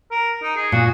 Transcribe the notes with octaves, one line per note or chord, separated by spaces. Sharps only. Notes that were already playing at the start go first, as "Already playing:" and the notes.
A#4
D#4
G#4
A#2 F#4